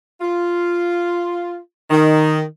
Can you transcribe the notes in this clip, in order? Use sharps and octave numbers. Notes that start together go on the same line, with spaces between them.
F4
D#3